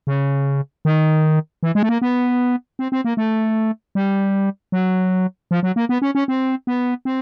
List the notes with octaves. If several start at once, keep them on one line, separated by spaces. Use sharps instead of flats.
C#3
D#3
E3
G#3
A3
A#3
B3
C4
C4
A#3
A3
G3
F#3
F3
F#3
A#3
B3
C#4
C#4
C4
B3
C4